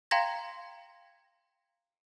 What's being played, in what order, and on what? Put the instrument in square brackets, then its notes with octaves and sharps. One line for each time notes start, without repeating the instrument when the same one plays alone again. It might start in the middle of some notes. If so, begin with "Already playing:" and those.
[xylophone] F5 G5 A#5 C6 G#6 A#6